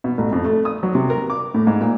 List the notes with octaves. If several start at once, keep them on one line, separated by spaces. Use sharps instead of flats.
B2
A1
F2
A3
D#6
F#3
C3
A#4
D6
A2
G#2
A#2